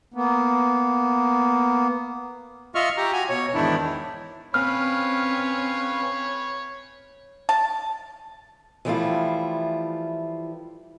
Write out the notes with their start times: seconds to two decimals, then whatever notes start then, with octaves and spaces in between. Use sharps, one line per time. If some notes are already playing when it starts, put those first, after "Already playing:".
0.14 A#3 B3
2.75 F4 D#5 E5 C#6 F6
2.97 G4 A#5
3.13 F#4 G#5
3.29 B2 C#5
3.54 E2 G#2 D#3 D4 E4
4.54 C4 C#4 B4 C#5 F5 B5 F6
7.49 A5
8.85 E3 F3 G3 A3 E4 F4